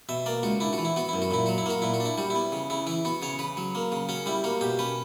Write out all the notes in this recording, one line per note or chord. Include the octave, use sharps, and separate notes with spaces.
B2 E5
A#3 D5
C#2 F#4
D4 E4
F#4
E3
E4
B3 F#4
F#2 E4
F#4
A#2 E4
F#3 F#4
E4
A#3 F#4
A#2 E4
F#4
D4
E4
G3 F#4
E4
B3
C#3
C#3 E4
E3 E4
B3 F#4
C#3 C#5
C#3 B4
F#3
A#3
C#3
C#4 F#4
G3 E4
A#3 F#4
B2 G4
C#4 B4